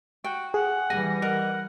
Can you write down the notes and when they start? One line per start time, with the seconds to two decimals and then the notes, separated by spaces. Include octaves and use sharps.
0.24 F#4 G5
0.54 G#4 F#5
0.90 E3 G3 G#5 A#6
1.22 A#4 D#5 F#5